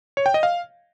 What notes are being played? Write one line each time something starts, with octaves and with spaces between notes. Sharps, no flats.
C#5
G5
D#5
F5